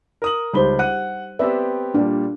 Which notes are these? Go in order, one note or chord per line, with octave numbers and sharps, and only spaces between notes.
A#4 D#6 F#7
C#2 G3 D#4 C5 B5 G7
F#5 F#6 D#7
B3 C4 G4 B4 D5 E5
A#2 G3 D4